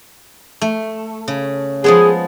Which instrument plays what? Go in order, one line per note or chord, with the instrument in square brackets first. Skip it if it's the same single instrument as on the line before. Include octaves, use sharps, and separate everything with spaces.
[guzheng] A3
C#3
[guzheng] F3 G#3 B3 [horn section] G#4